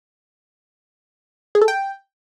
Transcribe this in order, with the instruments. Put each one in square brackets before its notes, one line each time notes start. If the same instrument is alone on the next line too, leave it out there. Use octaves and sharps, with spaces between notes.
[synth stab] G#4
A4
G5